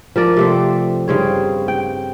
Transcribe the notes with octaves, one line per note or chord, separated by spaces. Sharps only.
F3 A#4 D5
C3 A3 C4
G2 C#3 C4 C#5
G5